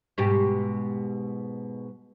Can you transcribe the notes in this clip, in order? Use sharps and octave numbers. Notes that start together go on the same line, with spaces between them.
G#2 B2 G4